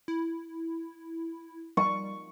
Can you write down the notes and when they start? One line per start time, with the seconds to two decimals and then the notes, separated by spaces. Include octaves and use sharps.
0.08 E4
1.77 G3 C#6